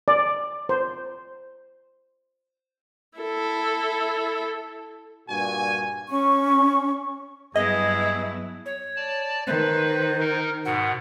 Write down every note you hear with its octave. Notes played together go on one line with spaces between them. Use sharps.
D5
C5
E4 A4
G2 A#2 F#4 G#5
C#4 C#6
G2 F#3 B3 E4 G#4 D#5
C#5
D5 A5
D#3 B4 C5
D#4 A#4
G#2 B2 F#5